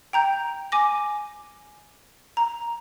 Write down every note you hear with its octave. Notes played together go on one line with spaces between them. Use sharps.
G5 A#5 G6
G#5 D6 A#6
A#5